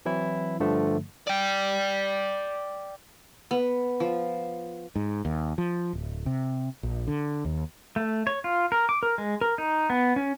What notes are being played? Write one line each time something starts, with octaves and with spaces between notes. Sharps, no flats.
E3 F#3 C4 E4
G2 D3 F3 A3
D5 G5
B3
F3
G#2
D#2
F3
D1
C3
A#1
D3
D#2
A3
C#5
F4
A#4
D6
A#4
G#3
A#4
D#4
B3
C#4